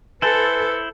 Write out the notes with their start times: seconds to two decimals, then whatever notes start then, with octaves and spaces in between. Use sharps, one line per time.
0.22 E4 A4 B4 C5 G#5 A5 A6